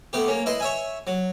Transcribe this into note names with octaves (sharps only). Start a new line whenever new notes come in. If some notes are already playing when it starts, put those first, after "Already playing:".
A3 B3 G4
A#3 C#4
E4 B4 D#5 C6
C#5 E5 G#5
F#3